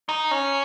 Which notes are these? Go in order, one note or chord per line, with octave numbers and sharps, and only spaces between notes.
D#4
C#4